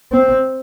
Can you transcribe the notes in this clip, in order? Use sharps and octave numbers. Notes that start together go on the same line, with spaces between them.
C4